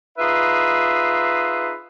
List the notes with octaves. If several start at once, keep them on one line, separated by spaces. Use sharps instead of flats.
D#4 F4 G#4 B4 E5